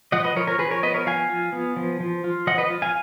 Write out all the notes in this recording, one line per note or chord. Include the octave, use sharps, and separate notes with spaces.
F3 D#5 F#5
B4 D#5
F3 A#4 C#5
A#4 C#5
F3 G#4 B4
A#4 C#5
B3 B4 D#5
A#4 C#5
F3 F5 G#5
F4
B3
F3
F3
F4
F3 D#5 F#5
B4 D#5
F4
F5 G#5